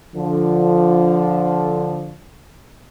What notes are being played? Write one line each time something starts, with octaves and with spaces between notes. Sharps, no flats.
D3 F3